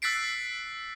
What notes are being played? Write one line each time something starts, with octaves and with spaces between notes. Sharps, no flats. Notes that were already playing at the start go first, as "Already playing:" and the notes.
E6 F#6 A6 B6 C7 D7